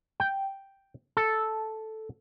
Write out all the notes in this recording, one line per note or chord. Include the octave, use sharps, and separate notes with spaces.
G5
A4